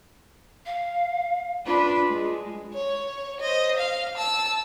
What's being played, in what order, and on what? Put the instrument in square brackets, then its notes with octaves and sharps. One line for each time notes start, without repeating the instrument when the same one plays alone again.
[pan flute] F5
[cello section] D4 B4 [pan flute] F4
[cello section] G#3
[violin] C#5
C5 D#5
F5
A5 E6